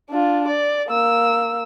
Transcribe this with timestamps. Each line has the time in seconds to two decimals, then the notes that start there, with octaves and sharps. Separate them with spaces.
0.10 D4 F4
0.48 D5
0.88 A#3 E6